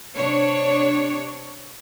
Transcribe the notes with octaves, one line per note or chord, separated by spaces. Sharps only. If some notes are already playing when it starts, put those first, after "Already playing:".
C3 D4 C#5